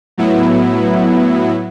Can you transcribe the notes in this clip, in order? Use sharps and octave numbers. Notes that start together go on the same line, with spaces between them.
A2 F#3 B3 E4